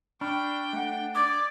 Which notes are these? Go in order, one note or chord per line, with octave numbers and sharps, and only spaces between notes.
D4 G5 B5 C#6 F6
A3 F#5
D5 D6 D#6 G#6 A6